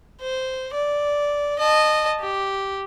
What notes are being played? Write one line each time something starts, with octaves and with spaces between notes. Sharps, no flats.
C5
D5
D#5 A5
G4